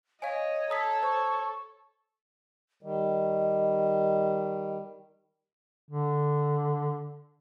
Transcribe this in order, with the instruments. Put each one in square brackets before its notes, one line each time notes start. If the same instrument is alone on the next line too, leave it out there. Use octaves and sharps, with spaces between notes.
[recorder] C#5 [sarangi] D#5 [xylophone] F5 G#5
[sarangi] A4 [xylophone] A#5 D#6 B6 [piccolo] E6
[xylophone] C5 [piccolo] C#6
[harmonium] D#3 G3 [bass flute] D#5
[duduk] D3